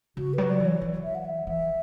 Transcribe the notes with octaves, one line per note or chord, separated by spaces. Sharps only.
C#3 F#4
F#3 B4
D5
E3
C#5
E3
E5
F#5
E5
E3 E5